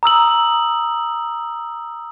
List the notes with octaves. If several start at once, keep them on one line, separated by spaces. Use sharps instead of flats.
A#5 D#6 E6 F#7